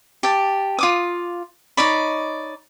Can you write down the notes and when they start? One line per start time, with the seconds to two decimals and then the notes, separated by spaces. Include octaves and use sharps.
0.23 G4 A5
0.79 F4 D6 D#6
1.77 D#4 C#5 D5 B5